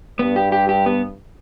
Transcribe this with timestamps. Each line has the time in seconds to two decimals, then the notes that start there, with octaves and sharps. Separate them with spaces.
0.19 G2 B3
0.36 G4
0.52 G4
0.69 G4
0.86 B3